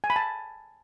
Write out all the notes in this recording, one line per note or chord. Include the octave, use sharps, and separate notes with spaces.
G#5
B5
A5